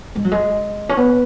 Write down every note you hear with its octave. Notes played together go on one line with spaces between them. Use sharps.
G#3
F#3
G#3
C#4
B3